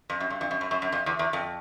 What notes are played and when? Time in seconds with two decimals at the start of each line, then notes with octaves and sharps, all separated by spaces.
0.10 F2
0.20 F#2
0.30 G2
0.41 F2
0.51 F#2
0.61 F#2
0.71 F#2
0.82 F#2
0.92 F2
1.06 E2
1.19 E2
1.33 F2